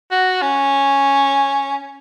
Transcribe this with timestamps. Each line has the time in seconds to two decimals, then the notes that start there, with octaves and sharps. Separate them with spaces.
0.12 F#4
0.42 C#4